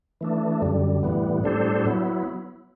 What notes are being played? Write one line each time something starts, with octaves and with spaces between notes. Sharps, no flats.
E3 A3 D4
F#2 D3 G3
A2 E3 G3 B3
A2 G3 D4 A4 C5
F#3 B3 E4